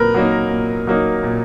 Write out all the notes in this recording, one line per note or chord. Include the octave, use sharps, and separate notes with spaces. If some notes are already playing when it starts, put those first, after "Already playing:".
Already playing: A#2 F#3 A#3 A#4 B4
F#3 A#3 D#4
A#2
F#3 A#3 D#4
A#2